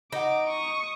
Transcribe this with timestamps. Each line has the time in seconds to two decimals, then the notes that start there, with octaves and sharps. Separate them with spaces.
0.12 D#4 D#5 F#5 D6
0.49 C#6 D#6